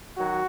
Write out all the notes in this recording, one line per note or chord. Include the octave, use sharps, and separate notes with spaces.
D#3 F#3 F#4